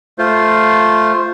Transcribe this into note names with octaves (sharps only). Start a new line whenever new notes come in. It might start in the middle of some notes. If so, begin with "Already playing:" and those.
A3 F4 C5